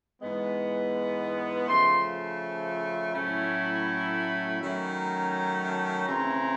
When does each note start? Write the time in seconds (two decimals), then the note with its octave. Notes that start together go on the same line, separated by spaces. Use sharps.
0.22 G#2 E3 G#3 B3
1.68 C#3 F3 A3 C6
3.13 A2 F#3 A3 C#4 E4 B5
3.86 B5
4.60 D#3 F#3 A3 C#4
4.96 A#5
5.69 A5
6.05 C#3 E3 A3 C4 E4 A#5